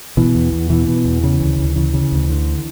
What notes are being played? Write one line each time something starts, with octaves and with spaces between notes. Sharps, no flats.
B2 E3
E2
E2
B2 E3
B2
E2
C#3
D2
D2
C#3 E3
C#3
D2
D3